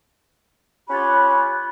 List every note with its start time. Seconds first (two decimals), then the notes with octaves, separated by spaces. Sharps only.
0.90 C#4 F4 G4 C#5 F#5 B5